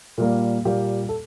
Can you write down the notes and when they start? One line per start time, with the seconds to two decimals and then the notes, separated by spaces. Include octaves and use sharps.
0.18 A#2 G3 A#3
0.65 A#2 G3 A#3 G4
1.09 A4